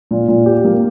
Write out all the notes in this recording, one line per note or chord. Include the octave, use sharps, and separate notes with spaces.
A#2
A#2
G4
A#3